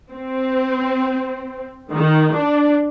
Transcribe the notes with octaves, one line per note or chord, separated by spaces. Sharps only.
C4
D#3
D4